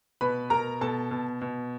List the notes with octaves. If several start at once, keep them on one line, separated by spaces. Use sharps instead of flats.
B2 B4 B5
B2 A#4 A#5
B2 A4 A5
B2
B2